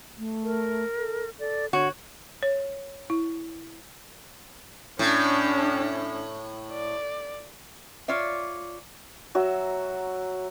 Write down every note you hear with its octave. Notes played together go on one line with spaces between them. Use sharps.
A3
A#4
A4
A4 D5
D3 F#4 C#5
C#5
E4
A2 C#4 D4
D5
F4 C#5 D5 E5
F#3 F#4 E5